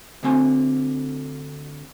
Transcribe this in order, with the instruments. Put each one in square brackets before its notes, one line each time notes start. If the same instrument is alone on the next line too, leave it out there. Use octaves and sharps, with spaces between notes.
[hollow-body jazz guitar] D2 D3 C4 G#5